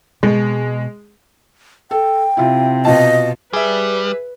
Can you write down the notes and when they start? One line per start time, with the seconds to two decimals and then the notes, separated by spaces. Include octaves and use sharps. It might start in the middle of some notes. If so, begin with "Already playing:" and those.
0.23 B2 G#3
1.91 A4 G5
2.37 C3 E4 F4
2.85 B2 F4 D#5 A5
3.53 G3 G#4 B4 E5